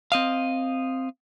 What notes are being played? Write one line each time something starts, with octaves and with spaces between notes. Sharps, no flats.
C4 D#5 F5